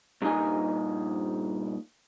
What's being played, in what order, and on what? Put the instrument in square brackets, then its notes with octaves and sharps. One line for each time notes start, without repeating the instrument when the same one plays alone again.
[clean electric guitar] G2 A#2 D3 D#4 G#5